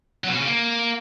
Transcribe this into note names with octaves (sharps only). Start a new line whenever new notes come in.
F#3
B2
C#4
C#3
A#3